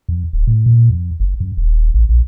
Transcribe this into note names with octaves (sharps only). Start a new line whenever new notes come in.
F2
D1
A2
A#2
F2
F#1
F#2
D#1
A1
A#1